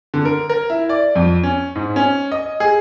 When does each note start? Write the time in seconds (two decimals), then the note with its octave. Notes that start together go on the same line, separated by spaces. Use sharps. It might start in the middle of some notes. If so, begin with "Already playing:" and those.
0.14 D3
0.25 A#4
0.49 A#4
0.70 E4
0.89 D5
1.15 F2
1.43 C#4
1.75 G#2
1.96 C#4
2.32 D#5
2.60 G#4